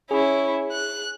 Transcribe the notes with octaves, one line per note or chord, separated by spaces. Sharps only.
C#4 E4 G#4
F#6